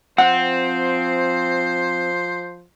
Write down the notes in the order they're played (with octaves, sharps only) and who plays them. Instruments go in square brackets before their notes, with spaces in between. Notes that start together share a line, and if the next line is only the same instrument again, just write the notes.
[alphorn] F3 [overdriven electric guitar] C4 [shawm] C5 [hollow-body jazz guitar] F#5